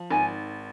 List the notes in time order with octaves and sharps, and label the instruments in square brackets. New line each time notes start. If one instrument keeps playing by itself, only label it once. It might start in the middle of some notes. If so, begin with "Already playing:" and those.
Already playing: [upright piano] F3
[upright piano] G#1 [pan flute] G#5